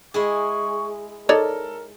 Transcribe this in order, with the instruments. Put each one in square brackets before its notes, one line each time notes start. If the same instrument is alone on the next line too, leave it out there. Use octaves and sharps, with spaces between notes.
[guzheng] G#3 E4 G#4 [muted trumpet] C#6
[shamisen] D#4 C#5 D5 [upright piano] A4 [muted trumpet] A#4